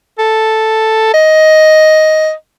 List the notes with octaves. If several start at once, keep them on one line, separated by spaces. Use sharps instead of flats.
A4
D#5